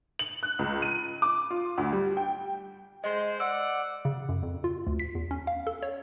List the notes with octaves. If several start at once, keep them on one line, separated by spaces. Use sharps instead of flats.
F#7
F#6
C#2
D#7
D6
F4
D2
G3
G5
G#3 C5 D#5
D5 F#5 E6
C#3
F#2
F2
F4
D2
B6
E2
C#4
F5
A4
C#5